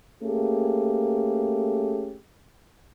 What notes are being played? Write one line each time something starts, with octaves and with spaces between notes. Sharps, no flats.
A3 A#3 C#4 G4 G#4